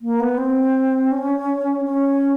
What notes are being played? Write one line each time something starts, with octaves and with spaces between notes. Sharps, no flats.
A#3
B3
C4
C#4
C#4